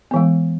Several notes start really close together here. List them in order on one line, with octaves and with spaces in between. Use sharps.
B3 E3 G#3